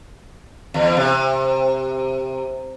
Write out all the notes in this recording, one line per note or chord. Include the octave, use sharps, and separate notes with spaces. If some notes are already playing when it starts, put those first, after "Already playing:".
E2
C3